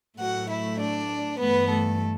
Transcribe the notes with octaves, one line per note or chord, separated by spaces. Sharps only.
A2 F#3 A3 F#4 F#5
E4 E5
D4 D5
G2 E3 A3 B3 B4
A3 A4